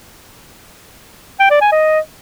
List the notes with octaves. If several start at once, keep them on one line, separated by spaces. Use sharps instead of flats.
G5
D5
G#5
D#5